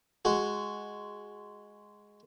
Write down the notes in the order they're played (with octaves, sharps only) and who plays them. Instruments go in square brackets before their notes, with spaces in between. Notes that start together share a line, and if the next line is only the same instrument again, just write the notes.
[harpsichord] G#3 F#4